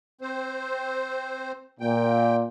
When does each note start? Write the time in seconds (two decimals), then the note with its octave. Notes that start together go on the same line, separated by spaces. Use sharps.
0.21 C4 C5
1.80 A#2 G5